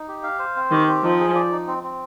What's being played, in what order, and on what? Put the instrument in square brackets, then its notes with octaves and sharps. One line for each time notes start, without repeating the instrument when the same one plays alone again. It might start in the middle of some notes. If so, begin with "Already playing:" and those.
Already playing: [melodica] D#4
G4
F5
C5
C4
[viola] D#3 [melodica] G4
[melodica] C4
[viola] F3 [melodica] D#4
[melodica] G#4
D5
D#4
C4
C4